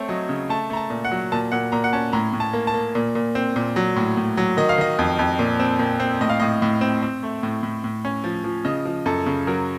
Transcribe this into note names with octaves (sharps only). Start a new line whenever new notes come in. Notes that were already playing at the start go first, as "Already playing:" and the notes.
Already playing: A3 C4 C#5
F#3 D#5
C#3
A3 A5
A3 A#5
A5
A#2
F#5
F#3
A#2 A5
A#2 F#5
A#2 A#5
F#5
C#4 A5
A2 A#5
A2
A5
A#3
A5
A#3
A#2
A#2
C4
A#2
F#3
A2
A2
F#3
D#3 D#5
F5
D#3 D#5
F2
F2
A#2
C4
A#2
C4
A2 D#5
F5
A2 D#5
A2
C4
C4
A3
A2
A2
A2
C#4
F3
F3
C#3 D#5
F3
F#2 A4
C#3
F#3 A#4